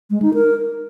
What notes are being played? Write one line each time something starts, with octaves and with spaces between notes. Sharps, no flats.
G#3
D#4
A#4